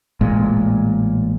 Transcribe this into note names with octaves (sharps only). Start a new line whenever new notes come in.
A1 A#2 G#3